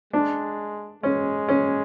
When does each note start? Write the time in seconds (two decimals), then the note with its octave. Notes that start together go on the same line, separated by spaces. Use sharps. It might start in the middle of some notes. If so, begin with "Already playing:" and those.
0.13 G#3 D4
1.03 G#3 C#4
1.48 C#4